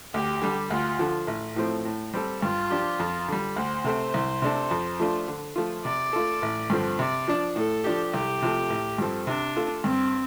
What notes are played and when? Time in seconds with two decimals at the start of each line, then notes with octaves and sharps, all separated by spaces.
0.14 D2 G4
0.42 D3 G3
0.70 D2 F4
0.99 D3 F3
1.27 A1
1.56 A2 F3 A3 C4
1.85 A2
2.14 G3 C4 A4
2.42 G2 F4
2.71 F3 D4 G4
2.99 F2
3.28 D3 G3
3.56 D2 C5
3.84 C3 A3 C4
4.14 C2
4.42 C3 A3 D4 A4
4.71 F2
5.00 F3 A3 D4 F4
5.28 D3
5.56 F3 A3 F4
5.85 C3 D5
6.13 A3 F4 A4
6.42 A1
6.70 G2 D3 F3 C4
6.99 C3 D5
7.28 F3 D4
7.56 A2 A4
7.84 F3 D4 G4
8.13 C2 G4
8.42 C3 F3 A3
8.70 A1
8.98 G2 F3 C4 A4
9.27 C3 D4
9.56 A3 F4 A4
9.84 G2 C4